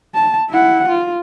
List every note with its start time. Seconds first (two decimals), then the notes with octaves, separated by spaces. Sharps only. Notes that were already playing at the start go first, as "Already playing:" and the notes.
0.14 A5
0.50 E4 F#5
0.88 F4